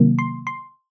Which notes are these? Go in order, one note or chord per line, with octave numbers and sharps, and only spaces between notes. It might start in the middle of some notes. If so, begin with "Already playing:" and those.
Already playing: C3 D#3 F#3 A#3
C6
C6